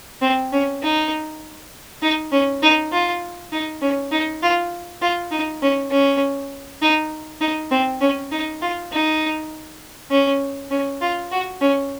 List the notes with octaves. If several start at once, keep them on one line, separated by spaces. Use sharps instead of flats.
C4
C#4
D#4
D#4
C#4
D#4
F4
D#4
C#4
D#4
F4
F4
D#4
C#4
C#4
D#4
D#4
C4
C#4
D#4
F4
D#4
C#4
C#4
F4
F#4
C#4